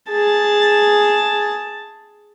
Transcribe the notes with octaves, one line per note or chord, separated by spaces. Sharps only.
G#4 A5